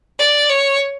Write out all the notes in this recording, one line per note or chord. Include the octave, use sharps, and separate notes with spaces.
D5
C#5